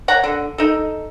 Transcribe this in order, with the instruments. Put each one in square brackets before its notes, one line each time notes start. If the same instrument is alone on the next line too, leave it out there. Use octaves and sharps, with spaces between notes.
[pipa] C#5 F#5 A#5
D3
D#4 A4